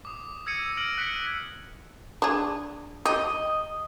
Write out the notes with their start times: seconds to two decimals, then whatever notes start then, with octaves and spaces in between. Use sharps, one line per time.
0.05 D6 D#6
0.46 E6 G#6 A#6 C#7 D#7
0.77 F6 A#6 D7 F#7
0.98 F#6 B6 C#7 D#7
2.22 D4 G#4
3.06 G4 D#5